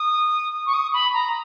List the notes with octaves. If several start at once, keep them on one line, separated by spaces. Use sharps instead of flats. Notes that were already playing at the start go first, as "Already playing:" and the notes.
Already playing: D#6
C#6
D#6
B5
A#5